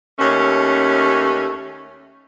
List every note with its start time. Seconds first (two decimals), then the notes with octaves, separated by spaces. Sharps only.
0.19 D#2 A3 C#4